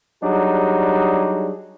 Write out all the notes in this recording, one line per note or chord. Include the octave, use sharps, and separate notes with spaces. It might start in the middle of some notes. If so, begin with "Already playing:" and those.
F#3 G3 D4 D#4 G#4